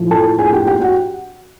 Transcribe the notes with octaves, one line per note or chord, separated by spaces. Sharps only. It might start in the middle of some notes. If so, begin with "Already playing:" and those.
Already playing: A2 F3 A3
A4 A5
G#4 G#5
G4 G5
G4 G5
F#4 F#5